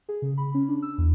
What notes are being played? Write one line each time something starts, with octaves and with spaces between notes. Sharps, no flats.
G#4
C#3
B5
C#4
D4
E6
E2